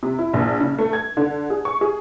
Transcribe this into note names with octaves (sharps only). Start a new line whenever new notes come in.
C3
E4
A#1
C#3
A3
G#6
D3
G#4
C#6
G#4